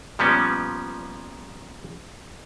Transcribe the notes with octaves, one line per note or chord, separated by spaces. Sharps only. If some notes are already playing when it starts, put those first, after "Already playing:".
A#2 F3 G3 B3 C#4